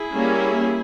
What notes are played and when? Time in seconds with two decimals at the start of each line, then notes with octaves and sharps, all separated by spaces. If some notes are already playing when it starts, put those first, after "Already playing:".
Already playing: E4 G#4
0.13 G3 A#3 C#4